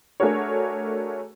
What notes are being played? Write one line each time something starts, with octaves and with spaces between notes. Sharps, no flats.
A3 D4 F#4 G#4 A#4 C#5